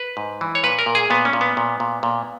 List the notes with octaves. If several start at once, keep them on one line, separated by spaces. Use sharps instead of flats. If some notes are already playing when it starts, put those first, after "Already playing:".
Already playing: B4
G#2
E3
C#5
A#2 B4
A#4
A#2
G#4
A#2 B3
C#4
A#2
B3
A#2
A#2
A#2